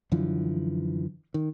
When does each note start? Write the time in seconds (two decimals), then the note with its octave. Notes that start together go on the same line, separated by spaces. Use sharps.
0.12 F#2 D3 E3 F3
1.34 D#3